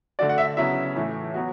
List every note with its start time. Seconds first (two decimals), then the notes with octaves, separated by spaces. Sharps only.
0.19 D3 A3 D4 F#4 D5
0.29 F#5
0.38 E5
0.57 C#3 F#3 B3 E4 E5
0.96 A2 E3 A3
1.34 F#3 B3 F#4